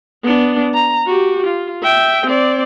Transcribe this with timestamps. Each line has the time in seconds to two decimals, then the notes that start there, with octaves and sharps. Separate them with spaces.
0.23 B3 D4
0.74 A#5
1.06 F#4 G4
1.47 F4
1.83 E5 G5
2.26 C4 D5